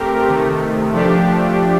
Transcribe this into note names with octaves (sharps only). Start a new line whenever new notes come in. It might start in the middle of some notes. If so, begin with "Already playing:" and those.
Already playing: A3 C4 G4 A#4
C3 D#3 A3
F3 A3 D4 G4